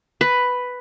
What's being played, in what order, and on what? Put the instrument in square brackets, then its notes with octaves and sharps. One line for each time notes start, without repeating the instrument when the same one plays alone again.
[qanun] B4